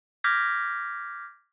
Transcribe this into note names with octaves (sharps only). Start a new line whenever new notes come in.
D6 F6 G6 G#6 A#6 B6